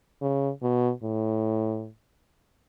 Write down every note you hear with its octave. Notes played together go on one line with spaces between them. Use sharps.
C#3
B2
A2